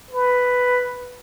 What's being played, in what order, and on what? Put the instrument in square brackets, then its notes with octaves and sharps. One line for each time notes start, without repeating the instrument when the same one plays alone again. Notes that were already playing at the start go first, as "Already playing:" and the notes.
[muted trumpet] B4